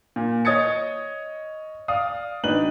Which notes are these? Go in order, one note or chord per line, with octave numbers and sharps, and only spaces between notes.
A#2
C#5 D#5 D#6 G#6 A6 C#7
D5 F5 D#6
G#1 D4 D#4 B4 F#7